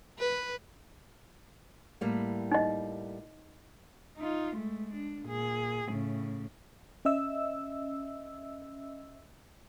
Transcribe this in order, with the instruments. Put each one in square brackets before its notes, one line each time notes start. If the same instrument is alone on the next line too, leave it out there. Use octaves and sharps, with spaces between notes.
[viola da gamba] B4
[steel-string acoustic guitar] A2 G3 A#3
[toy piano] D#4 D#5
[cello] D#4 F4
G#3 A3
D4
A#2 G#4
A2 C#3
[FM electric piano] C#4 D#5 E5 E6